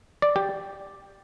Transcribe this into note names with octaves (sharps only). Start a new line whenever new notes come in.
D5
G4